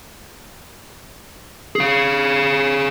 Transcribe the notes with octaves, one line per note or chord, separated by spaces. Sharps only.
G#4 F5